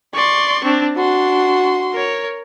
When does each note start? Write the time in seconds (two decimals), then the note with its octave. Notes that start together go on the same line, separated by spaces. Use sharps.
0.14 D5 C6 C#6
0.64 C4 D4
0.96 D4 F#4 C6
1.93 A#4 C#5